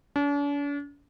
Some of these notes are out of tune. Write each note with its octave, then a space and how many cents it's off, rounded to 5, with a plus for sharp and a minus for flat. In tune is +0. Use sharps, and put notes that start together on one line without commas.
D4 -45